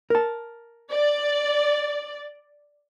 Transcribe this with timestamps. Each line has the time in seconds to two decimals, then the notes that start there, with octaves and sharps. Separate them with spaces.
0.10 A#4 A5
0.93 D5